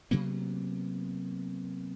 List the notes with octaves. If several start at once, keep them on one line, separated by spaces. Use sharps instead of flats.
C3 F#3 A#3 B3